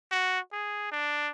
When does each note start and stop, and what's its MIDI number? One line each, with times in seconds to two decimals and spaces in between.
0.11 0.40 66
0.52 0.90 68
0.91 1.30 62